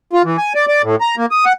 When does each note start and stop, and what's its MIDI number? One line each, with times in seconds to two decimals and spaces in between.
0.13 0.22 65
0.25 0.37 52
0.38 0.53 80
0.55 0.66 74
0.68 0.82 74
0.83 0.96 45
1.01 1.15 82
1.17 1.26 58
1.31 1.45 87
1.46 1.53 78